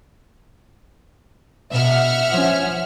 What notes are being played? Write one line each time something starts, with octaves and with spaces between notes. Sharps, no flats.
B2 E5 F#5 F6
F3 C#4